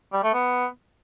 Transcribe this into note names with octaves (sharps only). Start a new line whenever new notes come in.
G3
A3
B3